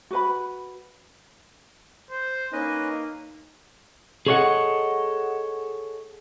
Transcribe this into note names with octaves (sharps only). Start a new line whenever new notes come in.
F#4 B4 B5
C5
A#3 C#4 D#4 B4 D#5
G#4 A4 C#5 D#5 F5 F#5